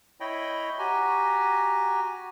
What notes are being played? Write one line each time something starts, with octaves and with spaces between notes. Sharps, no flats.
E4 C#5 D#5 G5 B5
F#4 G4 G#5 A#5